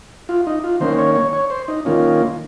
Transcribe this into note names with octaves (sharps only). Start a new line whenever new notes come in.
F4
D#4
F4
D#3 A#3 C#4 C5
C#5
C#5
C#5
C5
D#4
D#3 A#3 C#4 F4